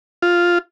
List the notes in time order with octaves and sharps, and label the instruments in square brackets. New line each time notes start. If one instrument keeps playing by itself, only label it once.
[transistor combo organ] F4